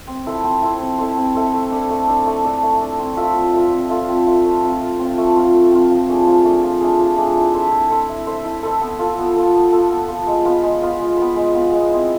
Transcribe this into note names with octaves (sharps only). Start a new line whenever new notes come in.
C4
E4 A4 C5
C4
E4 A4 C5
C4
E4 A4 C5
C4
E4 A4 C5
A3
D4 A4
A3
D4 A4
A3
D4 A4
A3
D4 A4
C4
F4 A4 E5
C4
F4 A4 E5
C4
F4 A4 E5
C4
F4 A4 E5
A3
C4 F4
A3
C4 F4
A3
C4 F4
A3
C4 F4
F3
A3 D4 G#4
F3
A3 D4 G#4
F3
A3 D4 G#4
F3
A3 D4 G#4
E4
A4 C5 E5
E4
A4 C5 E5
E4
A4 C5 E5
E4
A4 C5 E5
B3
F4 A4
B3
F4 A4
B3
F4 A4
B3
F4 A4
G#3
B3 F4 B4
G#3
B3 F4 B4
G#3
B3 F4 B4
G#3
B3 F4 B4
G#3
C4 E4